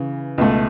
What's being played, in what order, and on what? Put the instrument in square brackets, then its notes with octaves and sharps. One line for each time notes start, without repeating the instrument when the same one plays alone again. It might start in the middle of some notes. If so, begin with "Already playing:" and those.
Already playing: [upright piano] C#3 E3
C#2 B2 A3